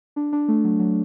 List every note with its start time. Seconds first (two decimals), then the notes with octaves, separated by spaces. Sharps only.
0.16 D4
0.33 D4
0.48 A3
0.64 F#3
0.79 F#3